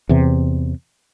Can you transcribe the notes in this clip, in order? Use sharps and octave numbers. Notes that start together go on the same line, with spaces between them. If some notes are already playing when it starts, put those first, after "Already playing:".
E2 C3